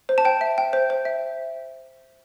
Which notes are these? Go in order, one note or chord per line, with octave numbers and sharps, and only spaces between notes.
C5
A5
C5 G5
E5
G5
C5
C5
E5